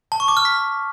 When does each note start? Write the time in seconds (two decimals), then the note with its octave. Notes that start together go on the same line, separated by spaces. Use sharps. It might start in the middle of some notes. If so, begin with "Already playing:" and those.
0.12 A5
0.20 C#6
0.28 D6
0.37 F6
0.45 B6